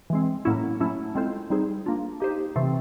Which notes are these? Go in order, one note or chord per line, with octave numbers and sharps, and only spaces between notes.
E3 G#3 C4
A2 F#3 A#3 C#4 E4
F#3 A3 C#4 E4
G#3 C4 F4 A4 C5
G3 C4 D#4 G#4 C5
A#3 D4 F4
A#3 D#4 G4 C5
C3 E3 A3 C4